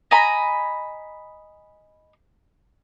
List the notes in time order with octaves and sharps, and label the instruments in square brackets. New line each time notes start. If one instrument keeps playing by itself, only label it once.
[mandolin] D#5 G#5 A#5 B5